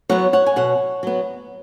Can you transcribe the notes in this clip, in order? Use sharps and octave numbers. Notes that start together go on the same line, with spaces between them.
F#3 B3 C#5 F#5
C#5 F#5
G#5
B2 C#5 F#5
F#3 B3